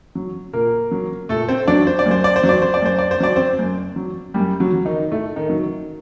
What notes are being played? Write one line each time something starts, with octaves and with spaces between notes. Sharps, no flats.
F#3
A#2 A#3 A#4
F#3
A#2 A3 A4
C4 C5
F#3 D4 D5
C5
D5
F#2
C5
D5
C5
F#3
D5
C5
D5
F#2 C5
D5
C5
F#3 D5
C4 C5
F#2
F#3
F#2 G3 G4
F#3 F#4
F#3
D#3 D#4
A2 A3
D#3 D#4
F#3